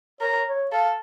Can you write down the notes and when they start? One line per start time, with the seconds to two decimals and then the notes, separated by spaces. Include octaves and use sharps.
0.21 A#4 C#5
0.46 C#5
0.71 A4 F5